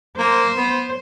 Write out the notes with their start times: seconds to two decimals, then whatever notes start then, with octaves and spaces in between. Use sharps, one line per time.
0.19 A#3 C5
0.57 B3